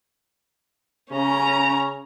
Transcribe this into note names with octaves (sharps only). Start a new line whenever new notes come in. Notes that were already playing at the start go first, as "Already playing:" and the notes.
C#3 C#4 A#5